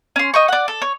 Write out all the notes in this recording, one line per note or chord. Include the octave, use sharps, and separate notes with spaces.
C#4 C6
D#5 G5 C#6
D5 F#5
A4
C#5